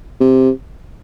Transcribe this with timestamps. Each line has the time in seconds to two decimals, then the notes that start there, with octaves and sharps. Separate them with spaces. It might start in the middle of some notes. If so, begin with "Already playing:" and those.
0.20 C3